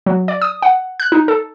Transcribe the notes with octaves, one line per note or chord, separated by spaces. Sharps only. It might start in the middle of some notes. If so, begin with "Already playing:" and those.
F#3
D5
D#6
F#5
F#6
D#4
A4